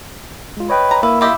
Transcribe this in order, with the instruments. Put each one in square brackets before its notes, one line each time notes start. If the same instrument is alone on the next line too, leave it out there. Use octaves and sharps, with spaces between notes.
[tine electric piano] G#3 F4
[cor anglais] B4 [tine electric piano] C#5 D#5 G5
[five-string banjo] A#5
[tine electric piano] A#3 [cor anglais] E4 [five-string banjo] B4
[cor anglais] E4 [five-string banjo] F4 G4 D#5